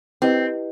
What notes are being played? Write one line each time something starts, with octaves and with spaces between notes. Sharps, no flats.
C4 E4 G4 B4 D#5